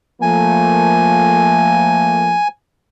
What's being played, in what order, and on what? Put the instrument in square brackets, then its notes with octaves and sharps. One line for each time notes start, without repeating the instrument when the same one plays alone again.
[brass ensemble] F3 A3 A#3 [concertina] G#5